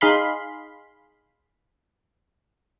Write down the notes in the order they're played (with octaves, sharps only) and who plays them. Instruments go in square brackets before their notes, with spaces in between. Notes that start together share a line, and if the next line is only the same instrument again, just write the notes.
[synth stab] D#4 G#4 F5 B5 C6